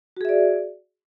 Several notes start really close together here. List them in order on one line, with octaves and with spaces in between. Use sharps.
F#4 G#4 E5 D5